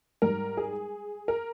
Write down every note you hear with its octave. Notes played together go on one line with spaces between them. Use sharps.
G#2 G3 A#4
G#4
A#4